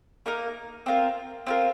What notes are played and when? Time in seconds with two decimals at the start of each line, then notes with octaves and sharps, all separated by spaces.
0.26 A#3 D#4 A#4
0.86 C4 F4 A#4
1.46 C4 F4 A#4